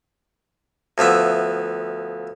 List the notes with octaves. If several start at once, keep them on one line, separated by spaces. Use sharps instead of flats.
D2 F3 B3 E5